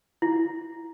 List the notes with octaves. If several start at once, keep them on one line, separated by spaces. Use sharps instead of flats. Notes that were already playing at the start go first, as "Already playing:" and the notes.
E4